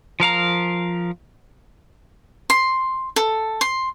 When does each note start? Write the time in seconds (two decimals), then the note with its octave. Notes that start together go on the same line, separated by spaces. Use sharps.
0.20 F3 A#4 F5 A#5
2.50 C6
3.16 A4
3.61 C6